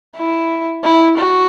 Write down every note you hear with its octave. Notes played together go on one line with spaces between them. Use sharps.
E4
E4
F#4